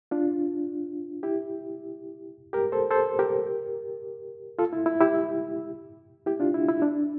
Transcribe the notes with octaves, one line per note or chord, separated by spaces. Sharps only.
D4 F4
E4 G4
G4 A#4
A4 C5
A4 C5
G4 A#4
F4 A4
E4
E4
E4 G4
E4 G4
D4 F4
E4
E4
D4